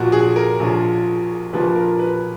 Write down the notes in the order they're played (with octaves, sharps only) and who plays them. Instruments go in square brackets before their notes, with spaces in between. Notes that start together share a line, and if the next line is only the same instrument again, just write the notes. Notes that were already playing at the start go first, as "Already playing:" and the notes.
Already playing: [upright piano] A#1 A#2 F3 F#4 A#4
G#4
A#4
A#1 A#2 F3
A#1 A#2 F3 B4
A#4
B4